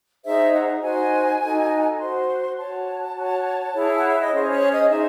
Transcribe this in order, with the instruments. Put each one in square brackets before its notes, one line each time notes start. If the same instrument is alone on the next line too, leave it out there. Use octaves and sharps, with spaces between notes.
[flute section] D#4 G#4 C5 E5
F#5
D#4 F#4 C5 G#5
D#4 F#4 A4
F#4 C5 C6
F#4 C#5 A5
F#4 C#5
E4 G#4 C#5
F#5
E5
D#5
C#4 G#4 C5 C#5
C#5
D#5
D#4 G#4 C5 E5